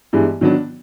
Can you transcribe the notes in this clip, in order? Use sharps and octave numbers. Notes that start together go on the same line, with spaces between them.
G2 E3 G#3 B3
D#3 F#3 B3 D4